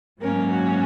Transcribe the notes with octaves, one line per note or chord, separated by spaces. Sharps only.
G#2 F#3 A#3 C#4 A#4
F#4